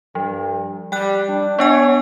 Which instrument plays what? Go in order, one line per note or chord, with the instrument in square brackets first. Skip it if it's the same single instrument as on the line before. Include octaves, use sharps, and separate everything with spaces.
[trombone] G2 [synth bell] F3
[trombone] G3 [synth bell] G5 F#6
[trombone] D4
[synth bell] B3 D4 G#5 [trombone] C#5